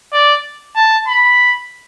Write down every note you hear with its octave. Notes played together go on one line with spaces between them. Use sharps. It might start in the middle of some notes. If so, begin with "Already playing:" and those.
D5
A5
B5